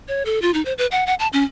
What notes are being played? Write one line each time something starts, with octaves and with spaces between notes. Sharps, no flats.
C#5
A4
F4
D#4
C5
B4
F#5
F#5
A5
C#4